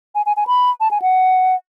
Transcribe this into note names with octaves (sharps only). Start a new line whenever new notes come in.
G#5
G#5
G#5
B5
A5
G#5
F#5